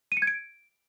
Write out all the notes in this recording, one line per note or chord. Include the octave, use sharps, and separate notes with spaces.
D#7
C#7
G#6
D7